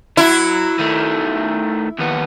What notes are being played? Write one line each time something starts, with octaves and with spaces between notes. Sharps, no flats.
F#3 E4
D#3 A3
D#2 B3